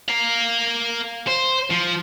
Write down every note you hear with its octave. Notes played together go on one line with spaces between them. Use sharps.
A#4 F5
C5
F3